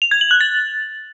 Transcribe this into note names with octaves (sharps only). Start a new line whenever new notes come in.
F7
G#6
F#7
F#6
A6